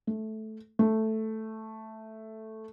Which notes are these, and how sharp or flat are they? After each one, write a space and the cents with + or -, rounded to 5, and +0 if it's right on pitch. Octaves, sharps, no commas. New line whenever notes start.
A3 -10
A3 +0